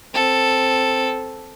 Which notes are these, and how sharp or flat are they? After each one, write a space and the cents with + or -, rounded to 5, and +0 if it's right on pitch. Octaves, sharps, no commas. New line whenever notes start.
C4 +0 A4 +0